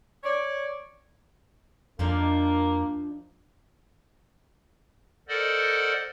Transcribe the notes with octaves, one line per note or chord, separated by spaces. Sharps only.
C#5 D5
F2 F3 A#3 D4 D#4
A4 A#4 C5 D5 D#5 F#5